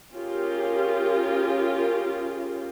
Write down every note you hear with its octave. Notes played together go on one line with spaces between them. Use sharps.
C#4 F4 G4 G#4 A#4